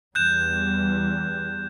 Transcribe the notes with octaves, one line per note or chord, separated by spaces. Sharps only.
E2 G3 F#6 G6 E7